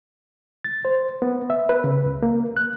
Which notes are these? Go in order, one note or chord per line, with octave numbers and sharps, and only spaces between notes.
A6
C5
B3
E5
B4
C#3
C#2
A#3
F#6